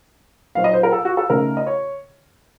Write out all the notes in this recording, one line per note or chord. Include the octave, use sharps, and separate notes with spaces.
A#2 F#3 C4 D#4 F5
D#5
C5
A#4
A4
F#4
A4
C#3 A3 D#4 A#4
D#5
C#5